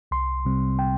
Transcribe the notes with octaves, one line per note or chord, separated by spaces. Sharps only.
C2 C6
C3 G3 C4
G5